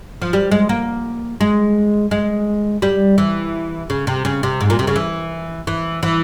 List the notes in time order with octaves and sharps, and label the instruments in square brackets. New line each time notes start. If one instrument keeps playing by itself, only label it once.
[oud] F3
G3
G#3
A#3
G#3
G#3
G3
E3
C#3
C3
C#3
C3
G#2
A#2
C3
C#3
E3
E3
E3